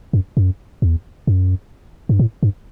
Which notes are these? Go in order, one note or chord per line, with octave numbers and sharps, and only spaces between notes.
F#2
F#2
E2
F#2
G2
A2
G2